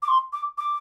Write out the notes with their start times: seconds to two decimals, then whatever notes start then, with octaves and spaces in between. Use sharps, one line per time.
0.02 D6
0.08 C6
0.33 D6
0.58 D6